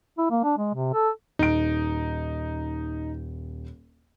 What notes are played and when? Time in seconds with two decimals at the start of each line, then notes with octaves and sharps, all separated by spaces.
0.18 E4
0.31 A#3
0.44 D4
0.58 G#3
0.74 C3
0.94 A4
1.39 D#1 D#4 D7